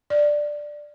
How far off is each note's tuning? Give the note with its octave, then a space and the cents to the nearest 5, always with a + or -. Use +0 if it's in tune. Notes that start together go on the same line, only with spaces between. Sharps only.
D5 +5